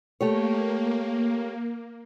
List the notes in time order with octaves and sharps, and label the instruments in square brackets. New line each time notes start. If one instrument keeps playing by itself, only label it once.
[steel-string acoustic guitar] A3 G4 C#5 [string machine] A#3